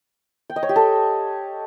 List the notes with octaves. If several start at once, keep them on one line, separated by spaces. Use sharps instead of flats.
G5
D#5
C#5
G4
A4